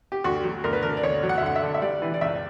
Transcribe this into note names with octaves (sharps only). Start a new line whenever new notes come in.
G4
D2 F#4
F#3
D2 A#4
B4
D3 A#4
D5
D2 C#5
F#3
F#5
E5
D2 F#5
E5
D3
E5
G3 D5
E3
D5
C#2 E5